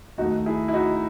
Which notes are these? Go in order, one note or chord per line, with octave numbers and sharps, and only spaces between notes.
D#2 D#3 A3 D#4 F#4
E4 G#4
E4
D#4 F#4